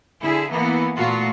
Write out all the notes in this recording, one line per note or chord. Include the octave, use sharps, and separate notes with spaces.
D3 E4 G#4
E3 A#3 B3
A#2 A3 F4 F#4